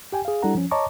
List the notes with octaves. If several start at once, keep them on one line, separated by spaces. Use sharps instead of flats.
G4 G5 G#5
G#4 F5
G3 D4 E4 A4 F#5 A#5
F3 C#4
C#5 D#5 A5 A#5 C#6 D6